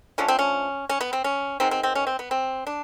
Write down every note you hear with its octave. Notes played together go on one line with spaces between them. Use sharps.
D3 F3 A3 C#4
C4
C#4
C#4
B3
C4
C#4
D#3 G#3 B3 C4
C4
C4
C#4
C4
B3
C4
D4